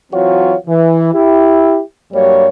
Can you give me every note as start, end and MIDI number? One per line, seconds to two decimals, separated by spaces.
0.12 0.55 52
0.12 0.55 54
0.12 0.55 60
0.12 0.55 65
0.12 0.55 66
0.12 0.55 73
0.67 1.13 52
1.13 1.80 64
1.13 1.80 67
2.12 2.48 43
2.12 2.48 54
2.12 2.48 55
2.12 2.48 58
2.12 2.48 73